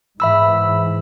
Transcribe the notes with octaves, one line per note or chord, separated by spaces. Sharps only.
G#2 E3 E5 B5 E6